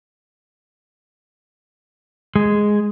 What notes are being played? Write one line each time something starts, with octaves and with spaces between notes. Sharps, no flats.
G#3